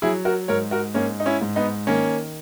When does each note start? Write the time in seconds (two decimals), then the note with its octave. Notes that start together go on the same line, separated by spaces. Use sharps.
0.02 F#3 E4 G#4
0.25 F#4 A#4
0.48 G#2 A#4 C#5
0.71 F#4 A#4
0.94 G#2 A#3 C#4
1.20 D#4
1.26 C#4 E4
1.41 G#2
1.56 B3 D#4
1.87 D#3 A#3 C#4